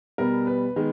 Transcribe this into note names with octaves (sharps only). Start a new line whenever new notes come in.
B2 G3 B3 A#4
B4
D#3 G#3 B3